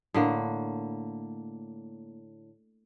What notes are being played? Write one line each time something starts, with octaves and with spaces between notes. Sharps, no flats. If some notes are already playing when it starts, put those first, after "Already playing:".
A2 D3 A#3